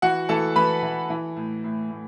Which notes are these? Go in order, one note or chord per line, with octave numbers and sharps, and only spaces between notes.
E3 F#4 F#5
E3 A4 A5
E3 B4 B5
E3
E3
A2
A2
A2